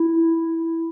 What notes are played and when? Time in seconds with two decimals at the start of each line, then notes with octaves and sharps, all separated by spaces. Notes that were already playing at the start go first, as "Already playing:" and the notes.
Already playing: E4